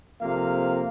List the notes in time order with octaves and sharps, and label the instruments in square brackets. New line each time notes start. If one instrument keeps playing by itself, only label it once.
[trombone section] F2 C3 A#3 [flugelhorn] F5